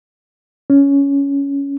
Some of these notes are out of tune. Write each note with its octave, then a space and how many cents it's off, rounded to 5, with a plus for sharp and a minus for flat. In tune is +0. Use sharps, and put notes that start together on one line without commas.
C#4 +10